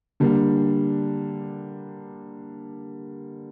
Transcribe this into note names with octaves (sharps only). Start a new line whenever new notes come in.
D3 G3 A#3 D4